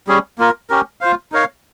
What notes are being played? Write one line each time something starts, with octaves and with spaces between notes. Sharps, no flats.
G3 C#4 G#4
A#3 F4 A#4
C#4 G4 A#4
F4 C5 F5
D#4 A#4 C#5 F5